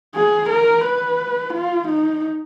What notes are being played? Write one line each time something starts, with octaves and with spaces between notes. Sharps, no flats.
G#4
A#4
B4
F4
D#4